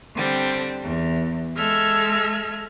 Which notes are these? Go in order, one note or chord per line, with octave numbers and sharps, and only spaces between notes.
D3 G3 C4
E2
G#3 A4 D#5 E5 F6 G#6